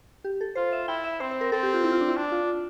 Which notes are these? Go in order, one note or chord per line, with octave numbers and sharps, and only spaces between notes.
G4
A4
F4 C5
E5
E4 G5
E5
C4 C5
C5
A#4
C4 A4
G4
F4
E4
F4
D4
E4
D4
F4